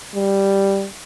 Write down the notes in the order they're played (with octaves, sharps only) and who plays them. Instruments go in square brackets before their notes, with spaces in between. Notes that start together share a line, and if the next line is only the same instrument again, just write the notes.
[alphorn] G3